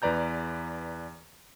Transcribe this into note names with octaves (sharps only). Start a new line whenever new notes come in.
E2 B4 D5 A#5 G6